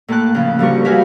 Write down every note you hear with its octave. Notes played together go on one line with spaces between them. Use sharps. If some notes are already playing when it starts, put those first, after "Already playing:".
A2 A#3 A5 F#6
C#3 F3
D2 G3 A#4 C#6
F#4 G4 B4 E5 F5 G#5